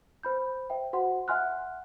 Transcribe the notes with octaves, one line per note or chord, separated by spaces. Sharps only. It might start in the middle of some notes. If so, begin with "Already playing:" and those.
C5 B5 G6
C5 E5 G5
F#4 C5 F#5 C6
E5 F#5 G#5 C6 F6 F#6